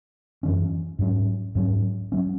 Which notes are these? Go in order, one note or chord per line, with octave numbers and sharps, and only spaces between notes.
F#2 E3 C#4
G#2 F#3 C#4
G#2 F#3 C#4
F#3 C#4